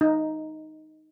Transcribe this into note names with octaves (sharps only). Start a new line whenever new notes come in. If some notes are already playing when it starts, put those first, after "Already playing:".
D#4